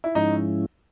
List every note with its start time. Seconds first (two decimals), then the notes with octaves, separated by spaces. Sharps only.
0.04 E4
0.15 G#2 F3 G#3 C#4 D#4 E4